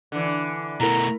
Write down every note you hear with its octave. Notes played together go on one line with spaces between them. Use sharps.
D3 E3
B2 A3 E4 A#4 A#5